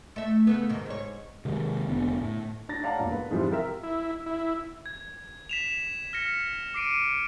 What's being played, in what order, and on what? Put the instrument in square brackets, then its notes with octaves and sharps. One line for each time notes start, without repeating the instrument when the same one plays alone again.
[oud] A3 E5
C#3 A3 B3
G#2 C3 D#3
G#2 C#5
[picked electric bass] C3 D#3 G#3
F1 D3 B3
A2
[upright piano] D4 A6 A#6
C#5 D5 F5 F#5 A5 A#5
E1 G2 A#2
B4
G#2 C3 E3 F3 G3
F4 G4 A#4 E5
[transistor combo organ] E4
E4
[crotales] G#6
B6 E7 F7
F6 A#6 C#7
D6 C7 D7 D#7